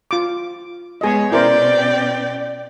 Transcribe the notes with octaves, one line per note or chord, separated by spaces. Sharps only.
F4 D6
G#3 B3 G#4 C#5 D#5
B2 C#4 E4 A#4 C5 D5 G5